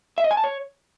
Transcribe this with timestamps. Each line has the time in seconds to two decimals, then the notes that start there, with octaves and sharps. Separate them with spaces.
0.18 E5
0.24 D#5
0.31 G#5
0.37 A5
0.44 C#5